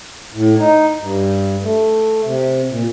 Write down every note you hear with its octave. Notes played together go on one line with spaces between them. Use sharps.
A2
D#4
G2
A3
C3
A#2